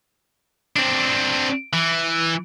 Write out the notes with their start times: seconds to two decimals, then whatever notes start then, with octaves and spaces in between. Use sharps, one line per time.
0.76 C4 D4
1.73 E3